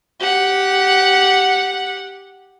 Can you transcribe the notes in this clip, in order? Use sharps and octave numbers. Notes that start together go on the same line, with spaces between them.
G4 F#5